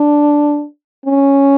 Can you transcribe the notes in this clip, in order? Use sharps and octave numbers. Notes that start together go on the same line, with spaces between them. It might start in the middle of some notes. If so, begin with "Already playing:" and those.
Already playing: D4
C#4